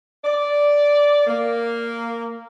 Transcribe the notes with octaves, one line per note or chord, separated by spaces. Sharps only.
D5
A#3